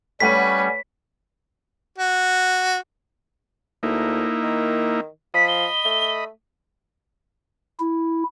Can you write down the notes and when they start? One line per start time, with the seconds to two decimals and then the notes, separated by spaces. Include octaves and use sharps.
0.20 G3 A3 C#4 B4 C#5 F#5 B6 D#7
1.98 F#4
3.83 D2 A#3 D#4 E4
4.43 D#3
5.34 F3 D#5 B5 B6
5.48 G7
5.85 A3
7.79 E4